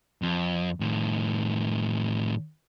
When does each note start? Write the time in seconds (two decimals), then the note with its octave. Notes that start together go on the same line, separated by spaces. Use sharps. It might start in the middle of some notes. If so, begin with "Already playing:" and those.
0.22 F2
0.80 A2 D#3